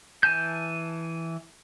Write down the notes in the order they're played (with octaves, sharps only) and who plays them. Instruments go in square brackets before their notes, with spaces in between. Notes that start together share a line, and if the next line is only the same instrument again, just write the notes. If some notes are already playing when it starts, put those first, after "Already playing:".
[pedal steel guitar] E3 G#5 A5 G6